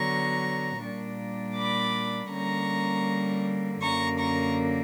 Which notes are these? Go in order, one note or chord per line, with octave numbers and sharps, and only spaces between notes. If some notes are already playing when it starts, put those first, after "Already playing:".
Already playing: D3 F#3 B3 A#5 C#6
A#2 G3 A#3 D4
B5 D6
D3 G3 A#3 C#4 A#5 C#6
F#2 D3 A#3 A#5 C#6
A#5 C#6